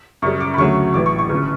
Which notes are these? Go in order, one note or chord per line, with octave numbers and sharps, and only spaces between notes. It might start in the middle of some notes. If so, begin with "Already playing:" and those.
F#2 C#3 G3 C#6
D6
B5
D2 C#3 F#3 A3 C#6
A1 A2 E3 D6
C#6
C#6
G1 C#3